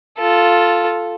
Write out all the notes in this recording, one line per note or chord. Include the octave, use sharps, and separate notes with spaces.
F4 A4